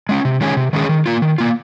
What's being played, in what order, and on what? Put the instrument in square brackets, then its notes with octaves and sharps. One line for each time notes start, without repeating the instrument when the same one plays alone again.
[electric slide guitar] G#3 C#4
C3
D#3 G#3 C#4 G#4
C3
D#3 G#3 C#4 G#4
D#3
A#3 F4
D#3
A#3 F4